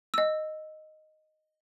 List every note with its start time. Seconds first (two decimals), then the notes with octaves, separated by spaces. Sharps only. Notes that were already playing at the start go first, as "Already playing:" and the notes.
0.14 D#5 E6